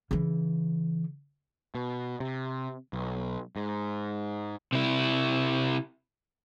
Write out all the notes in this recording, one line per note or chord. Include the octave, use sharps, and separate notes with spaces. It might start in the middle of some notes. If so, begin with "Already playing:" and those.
C#3 E3
B2
C3
B1
G#2
C3 E4